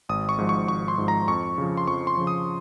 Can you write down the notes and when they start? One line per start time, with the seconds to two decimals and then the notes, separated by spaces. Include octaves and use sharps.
0.09 G#1 D#6
0.29 C#6
0.38 G#2 F3
0.49 C#6
0.68 G#1 C#6
0.88 C6
0.98 G#2 F3
1.08 A#5
1.28 F2 C#6
1.58 C#3 F3
1.77 C6
1.87 F2 C#6
2.07 C6
2.17 C#3 F3
2.27 D#6